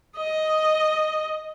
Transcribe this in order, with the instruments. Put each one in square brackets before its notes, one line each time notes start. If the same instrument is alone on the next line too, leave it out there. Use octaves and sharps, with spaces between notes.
[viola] D#5